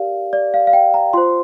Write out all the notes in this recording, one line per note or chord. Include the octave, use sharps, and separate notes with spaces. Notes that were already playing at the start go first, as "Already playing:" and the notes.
Already playing: G4 A#4 D5 F5
D5
F5
F5
G5
A#5
F4 C5 C6